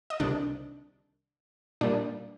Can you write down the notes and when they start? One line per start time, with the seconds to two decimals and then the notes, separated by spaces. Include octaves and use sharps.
0.10 D#5
0.20 C2 C3 D#3 D4 D5
1.81 A#2 G3 A#3 D4 D5